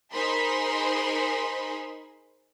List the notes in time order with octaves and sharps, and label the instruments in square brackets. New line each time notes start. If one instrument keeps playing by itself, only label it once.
[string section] D#4 G#4 A#4 C5 B5 C6